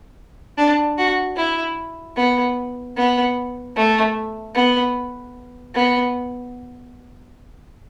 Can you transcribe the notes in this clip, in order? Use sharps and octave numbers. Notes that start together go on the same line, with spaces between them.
D4
F#4
E4
B3
B3
A3
B3
B3